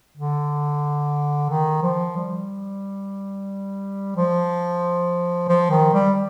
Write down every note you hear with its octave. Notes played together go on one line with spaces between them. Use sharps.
D3
D#3
F3
G3
F3
F3
D#3
G3